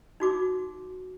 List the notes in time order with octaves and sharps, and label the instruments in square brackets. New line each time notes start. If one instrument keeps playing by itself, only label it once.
[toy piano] D#4 F#4 D6